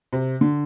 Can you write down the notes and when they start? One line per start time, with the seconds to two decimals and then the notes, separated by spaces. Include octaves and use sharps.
0.13 C3
0.41 D3